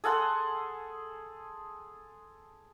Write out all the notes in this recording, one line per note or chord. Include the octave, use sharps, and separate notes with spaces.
G#4 A4 F#5 C6